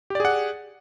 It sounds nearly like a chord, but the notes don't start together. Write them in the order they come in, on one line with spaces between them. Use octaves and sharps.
G4 D5 G#4 F#5